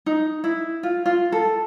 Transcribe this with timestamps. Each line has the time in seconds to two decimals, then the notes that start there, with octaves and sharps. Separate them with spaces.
0.06 D#4
0.44 E4
0.83 F4
1.06 F4
1.32 A4